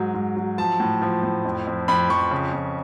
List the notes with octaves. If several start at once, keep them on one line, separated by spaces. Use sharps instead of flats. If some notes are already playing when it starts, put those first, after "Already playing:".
Already playing: G#2 F#3
G#2
F#3
F3 A5
A2
F3
A2
F2
F2
F2 B5
F2 C#6
C#3
F2